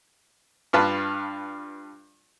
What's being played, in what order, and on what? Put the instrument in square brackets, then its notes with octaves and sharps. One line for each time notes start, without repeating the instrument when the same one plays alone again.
[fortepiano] G2 F4 B4 A5